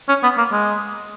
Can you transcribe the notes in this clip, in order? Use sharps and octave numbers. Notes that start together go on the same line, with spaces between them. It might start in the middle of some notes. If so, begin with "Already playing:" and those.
C#4
B3
A#3
G#3